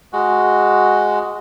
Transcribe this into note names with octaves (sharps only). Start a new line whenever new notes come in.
G#3 F#4